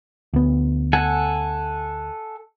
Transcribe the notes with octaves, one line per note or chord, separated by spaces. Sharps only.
D2 B3
A4 F#5 G#5